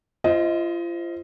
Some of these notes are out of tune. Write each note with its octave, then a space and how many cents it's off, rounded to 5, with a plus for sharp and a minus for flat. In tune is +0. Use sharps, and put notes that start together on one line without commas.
F4 -35 C5 +0 D#5 +15